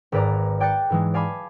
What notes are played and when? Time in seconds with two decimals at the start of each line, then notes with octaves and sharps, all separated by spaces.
0.12 G#1 G#2 B4 D5 A#5
0.60 D5 G5 F#6 G6 A6 C#7
0.90 G#2 E3 G#3
1.14 D5 F5 G#5 A5 B5 D6